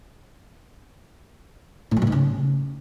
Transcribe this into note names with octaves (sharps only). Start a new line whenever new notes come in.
A2
F#3
A#2
G#2
C#3